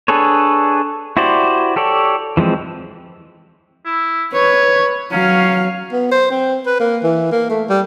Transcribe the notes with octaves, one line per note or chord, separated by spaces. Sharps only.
D4 G#4 A4 B4 C#5
E4 F#4 G4 C5 D5
G4 A4 C#5 D5
E3 F3 G#3 C4
E4
B4 C#5
F#3 C#4 F5
B3
C5
C4
B4
A#3
E3
A#3
A3
G3